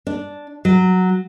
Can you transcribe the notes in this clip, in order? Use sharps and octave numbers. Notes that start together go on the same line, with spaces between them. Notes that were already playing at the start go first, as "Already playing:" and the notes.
D4
F#3